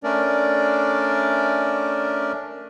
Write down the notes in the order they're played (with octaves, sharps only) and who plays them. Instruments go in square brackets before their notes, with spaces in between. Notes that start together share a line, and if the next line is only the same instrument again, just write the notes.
[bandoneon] A3 C#4 D4 A#4 D5